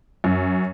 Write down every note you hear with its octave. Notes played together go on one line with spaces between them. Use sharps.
F#2